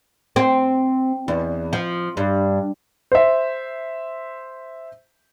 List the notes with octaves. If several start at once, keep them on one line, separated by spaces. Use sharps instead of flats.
C4
E2
F3
G2
C5 E5